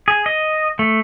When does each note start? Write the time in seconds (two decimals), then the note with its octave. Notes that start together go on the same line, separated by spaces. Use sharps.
0.08 G#4
0.26 D#5
0.79 A3